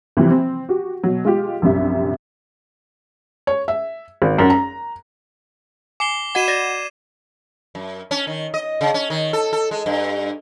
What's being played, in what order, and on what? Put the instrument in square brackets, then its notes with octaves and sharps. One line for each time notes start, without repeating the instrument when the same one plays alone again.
[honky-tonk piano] C3 E3 F3 G3 A#3 C4
C4
F#4 G4
B2 F#3
G#3 F4 G4
A#1 F#2 C3 G3 E5
[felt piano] C#5
E5
G#1
F#2
A#5
[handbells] G#5 [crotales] D6 C7 G7
[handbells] F#4 D#5 F#5 [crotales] G#6 D#7 E7
[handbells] D5 A6 A#6
[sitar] F#2
C#4
D#3
D#5
C#3
C#4
D#3
A4
A4
G#3
G2